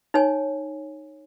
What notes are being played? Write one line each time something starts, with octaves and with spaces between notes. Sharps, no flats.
D#4 C#5 G#5